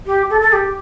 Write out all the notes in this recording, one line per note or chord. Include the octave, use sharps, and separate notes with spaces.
G4
A4
A4
G4